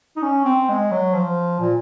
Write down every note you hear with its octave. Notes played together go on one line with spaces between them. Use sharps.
D#4
C#4
C4
G#3
F#3
F3
A#2